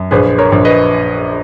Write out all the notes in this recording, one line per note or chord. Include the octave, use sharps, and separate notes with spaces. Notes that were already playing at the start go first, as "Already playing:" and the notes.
Already playing: F#2
A#1 G#4 B4
A#4 C#5
A#1
B4 D#5